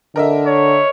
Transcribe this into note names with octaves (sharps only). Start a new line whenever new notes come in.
D3 A#4 D#5 E5
C#5